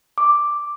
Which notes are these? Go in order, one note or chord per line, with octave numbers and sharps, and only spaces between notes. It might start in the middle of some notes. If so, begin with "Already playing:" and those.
D6